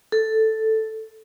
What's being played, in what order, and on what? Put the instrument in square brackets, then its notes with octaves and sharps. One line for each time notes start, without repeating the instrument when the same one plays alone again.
[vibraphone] A4